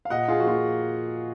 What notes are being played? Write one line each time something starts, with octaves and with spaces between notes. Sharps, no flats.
F5
A#2 D#5 F#5
F4 G#4
F3 A#3 F4 F#4